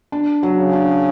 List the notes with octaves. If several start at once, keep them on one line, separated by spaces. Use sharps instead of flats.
D4
F#3
C#3
D4